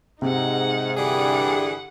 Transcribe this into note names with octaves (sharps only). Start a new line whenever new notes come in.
G#2 C3 D#4 F#5
G2 D3 E3 G3 G#4 F#5